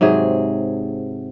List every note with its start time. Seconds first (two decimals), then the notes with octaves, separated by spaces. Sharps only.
0.01 G#2 C3 F#3 G#4